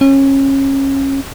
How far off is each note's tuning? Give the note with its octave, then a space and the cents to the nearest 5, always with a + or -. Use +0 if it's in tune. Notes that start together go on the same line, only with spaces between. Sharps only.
C#4 -25